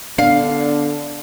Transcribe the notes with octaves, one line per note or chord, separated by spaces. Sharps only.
D3 B3 D4 F5